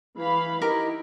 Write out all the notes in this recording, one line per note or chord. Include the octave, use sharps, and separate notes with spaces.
E3 F5 B5
D#4 E4 G4 A#4